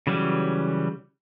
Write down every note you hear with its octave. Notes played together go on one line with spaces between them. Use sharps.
C#3 E3 F#3 G3 C#4